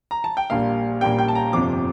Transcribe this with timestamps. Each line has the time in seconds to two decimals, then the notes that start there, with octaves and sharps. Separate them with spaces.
0.11 A#5
0.24 A5
0.37 G5
0.50 A#1 A#2 G3 A#3 F5
1.01 A#1 A#2 G3 A#3 G5
1.19 G5
1.28 A5
1.35 A#5
1.53 G1 F2 C3 F3 D6